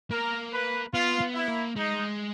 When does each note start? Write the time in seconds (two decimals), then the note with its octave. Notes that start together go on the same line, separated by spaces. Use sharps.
0.11 A#3 A#4
0.52 B4
0.93 B3 F4
1.21 B3
1.35 E4
1.48 A#3
1.76 G#3 D#4